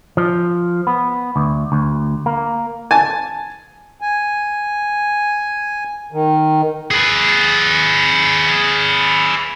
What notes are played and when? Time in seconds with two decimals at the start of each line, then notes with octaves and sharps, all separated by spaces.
0.17 F3
0.87 B3
1.36 D2
1.72 D2
2.26 A#3
2.91 G#5 A5
4.01 G#5
6.12 D#3
6.91 G#4 B4